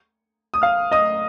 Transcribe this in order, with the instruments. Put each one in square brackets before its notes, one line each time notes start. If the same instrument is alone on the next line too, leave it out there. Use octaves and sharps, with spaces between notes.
[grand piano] D#6
F5 F6
D#5 D#6